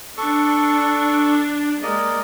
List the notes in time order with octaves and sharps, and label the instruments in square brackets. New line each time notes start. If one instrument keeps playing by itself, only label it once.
[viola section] D4 [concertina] A4 C#6
[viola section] G#3 [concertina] A#3 D5 D#5